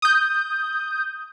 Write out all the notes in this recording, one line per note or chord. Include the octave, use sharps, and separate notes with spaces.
D#6 G6